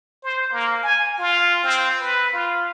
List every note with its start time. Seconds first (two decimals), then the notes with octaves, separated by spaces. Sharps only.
0.23 C5
0.52 A#3
0.83 G#5
1.19 F4
1.64 C4
2.01 B4
2.33 F4